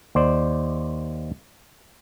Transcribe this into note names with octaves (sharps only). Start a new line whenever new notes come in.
D#2 C5 D5